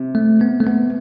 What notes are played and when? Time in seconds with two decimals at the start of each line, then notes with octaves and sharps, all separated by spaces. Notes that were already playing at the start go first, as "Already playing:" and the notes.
Already playing: C3
0.15 A3
0.41 B3
0.60 A3
0.67 B3